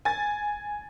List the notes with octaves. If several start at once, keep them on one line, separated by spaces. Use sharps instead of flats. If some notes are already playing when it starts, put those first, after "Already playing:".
G#5 A6